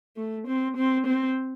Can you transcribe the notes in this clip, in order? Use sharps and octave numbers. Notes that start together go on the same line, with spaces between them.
A3
C4
C4
C4